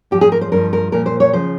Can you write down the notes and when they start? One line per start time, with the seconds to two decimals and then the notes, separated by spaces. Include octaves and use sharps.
0.11 G#2 F3 G4
0.21 G#4
0.32 A#4
0.41 C5
0.52 G2 F3 A#4
0.73 A#4
0.92 A#2 F3 A#4
1.06 C5
1.20 C#5
1.33 C#3 F3 C5